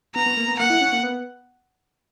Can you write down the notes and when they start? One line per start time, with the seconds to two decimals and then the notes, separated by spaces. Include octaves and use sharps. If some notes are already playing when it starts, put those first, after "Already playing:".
0.15 B3 A#5
0.26 B3
0.37 A#3
0.48 B3
0.59 A#3 F#5
0.70 E4
0.81 C#4
0.92 A#3
1.03 B3